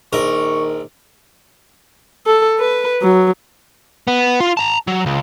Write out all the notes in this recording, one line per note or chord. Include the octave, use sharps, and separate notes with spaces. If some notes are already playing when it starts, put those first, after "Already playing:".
A#1 D#3 A#4 C#6
A4
B4
F#3
B3
F4
A5 A#5
F#3
C#2